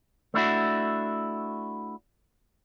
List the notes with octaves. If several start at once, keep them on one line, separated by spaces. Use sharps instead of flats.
A3 D4 E4 F#4